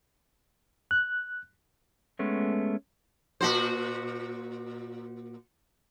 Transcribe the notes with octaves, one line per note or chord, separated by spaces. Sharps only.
F#6
G#3 A3 B3 C#4
A#2 F#4 C5